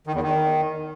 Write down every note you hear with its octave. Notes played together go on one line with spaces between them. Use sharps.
D#3
E2
D#3